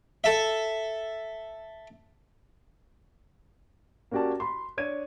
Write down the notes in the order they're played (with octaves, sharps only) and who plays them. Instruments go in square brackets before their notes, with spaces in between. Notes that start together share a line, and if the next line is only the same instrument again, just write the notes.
[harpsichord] A4 E5
[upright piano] A#3 C#4 F#4 G4 D5 A5
B5 C6
D4 C#5 G#6 D#7